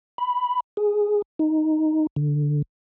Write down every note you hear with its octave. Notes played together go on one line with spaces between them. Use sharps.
B5
G#4
D#4
D3